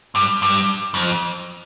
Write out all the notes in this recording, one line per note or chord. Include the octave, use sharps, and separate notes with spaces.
G2
G2
F2